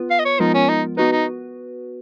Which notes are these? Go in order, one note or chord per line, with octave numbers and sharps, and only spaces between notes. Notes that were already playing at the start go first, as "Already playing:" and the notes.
Already playing: B3 F4 B4
F5
D#5
C#5
F3 G#3 B3 D#4 F4 A#4
C#4
D#4
B3 D#4 F#4 B4
D#4